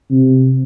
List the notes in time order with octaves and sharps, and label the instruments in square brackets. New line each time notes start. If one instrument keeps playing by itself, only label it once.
[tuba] C3